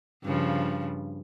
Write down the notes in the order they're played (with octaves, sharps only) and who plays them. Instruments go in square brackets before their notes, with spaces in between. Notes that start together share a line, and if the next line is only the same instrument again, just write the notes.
[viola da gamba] G2 C#3 F3